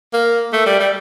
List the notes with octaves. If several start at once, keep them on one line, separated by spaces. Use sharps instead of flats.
A#3
A3
G3
G3